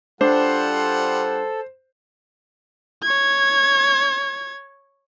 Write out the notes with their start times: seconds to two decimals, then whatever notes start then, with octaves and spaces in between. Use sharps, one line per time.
0.21 G3 D4 F4 A4 C5 F#5
3.03 C#5 G#6